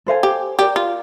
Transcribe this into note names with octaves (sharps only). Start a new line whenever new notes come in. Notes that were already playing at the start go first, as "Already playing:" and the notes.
A4 C5 F5 G#5
G4
F#4 G4 A#4 D5
F4